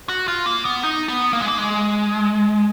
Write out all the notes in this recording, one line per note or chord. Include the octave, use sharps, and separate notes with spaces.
F#4
F4
A#3
B3
D#4
B3
A#3
G#3
A#3
G#3